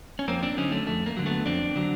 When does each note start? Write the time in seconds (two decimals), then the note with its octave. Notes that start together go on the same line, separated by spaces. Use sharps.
0.19 C#4
0.28 F2 A#3 C4
0.43 C4 D4
0.57 D3 F#3 C#4 D#4
0.72 A3
0.86 F2 A3
1.06 A#3
1.17 D3 F#3
1.26 A3 B3
1.46 F2 C4 D4
1.76 D3 F#3